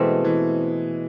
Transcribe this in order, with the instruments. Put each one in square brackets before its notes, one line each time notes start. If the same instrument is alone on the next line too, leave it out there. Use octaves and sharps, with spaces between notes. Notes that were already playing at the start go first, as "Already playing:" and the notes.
Already playing: [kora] B2 A3 C4 [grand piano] E3 G#3
[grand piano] E3